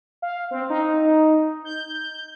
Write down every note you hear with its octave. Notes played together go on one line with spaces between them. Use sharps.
F5
C4
D#4
G6